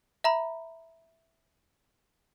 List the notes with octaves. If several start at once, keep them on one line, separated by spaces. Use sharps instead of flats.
E5 A#5 B5